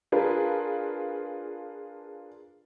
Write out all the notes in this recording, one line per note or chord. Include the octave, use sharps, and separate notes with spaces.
D4 F4 G#4 A#4 B4